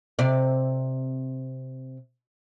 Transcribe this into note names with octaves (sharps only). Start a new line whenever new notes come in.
C3 D5